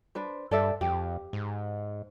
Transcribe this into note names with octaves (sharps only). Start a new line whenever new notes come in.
D4 B4 C5
G2 A4 D5 E5
F2 G4
G#2